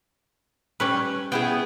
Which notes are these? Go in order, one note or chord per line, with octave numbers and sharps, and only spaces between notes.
G3 C#4 B4
B3 E4 G#4 G5